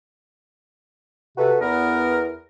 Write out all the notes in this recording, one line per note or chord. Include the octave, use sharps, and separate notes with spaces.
C3 F#4 A4 B4
E2 B3 A#4